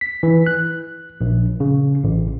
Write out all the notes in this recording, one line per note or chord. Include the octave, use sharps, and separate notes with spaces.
B6
E3
F#6
A#1
C#3
A1